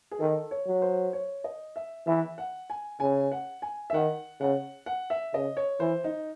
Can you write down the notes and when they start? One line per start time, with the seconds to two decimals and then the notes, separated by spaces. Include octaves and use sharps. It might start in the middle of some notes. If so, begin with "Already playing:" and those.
0.11 G#4
0.20 D#3 A4
0.51 C#5
0.67 F#3
0.82 C5
1.13 C#5
1.44 D#5
1.76 E5
2.07 E3 E5
2.38 F#5
2.70 G#5
3.00 C#3 G#5
3.32 F#5
3.62 G#5
3.90 E5
3.93 D#3 F#5
4.40 C#3 F#5
4.86 F#5
5.10 E5
5.34 C#3 D#5
5.57 C#5
5.80 E3 C5
6.04 D#4